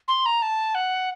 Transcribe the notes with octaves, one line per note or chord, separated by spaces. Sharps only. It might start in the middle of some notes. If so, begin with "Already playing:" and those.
C6
A#5
A5
F#5